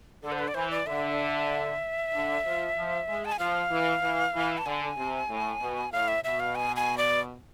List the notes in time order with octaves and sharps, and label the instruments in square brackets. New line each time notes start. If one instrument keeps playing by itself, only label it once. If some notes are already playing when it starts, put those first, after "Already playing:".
[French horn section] D3 [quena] A4
[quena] C5
B4
D5
[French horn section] E3 [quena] C5
[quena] D5
[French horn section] D3 [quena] E5
[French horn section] D3
F3
F3
G#3
[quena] A5
G#5
[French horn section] F3 [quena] F5
[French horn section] E3
E3
E3
[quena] A5
[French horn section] D3 [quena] G#5
[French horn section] C3
A2
B2
[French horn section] A2 [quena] F5
[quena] E5
[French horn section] B2 [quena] E5
[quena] F5
G#5
G#5
D5